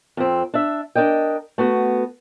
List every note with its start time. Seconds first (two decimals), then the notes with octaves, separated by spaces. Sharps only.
0.17 F2 C4
0.54 D4 E5
0.95 D4 A#4 D#5 G5
1.58 A3 B3 F#4